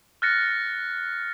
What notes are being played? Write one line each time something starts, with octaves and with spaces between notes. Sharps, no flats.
F6 F#6 A6 A#6 C#7